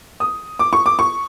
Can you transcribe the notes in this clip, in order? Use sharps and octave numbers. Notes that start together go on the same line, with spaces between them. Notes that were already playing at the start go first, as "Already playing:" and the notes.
D#6
D6
C#6
D6
C#6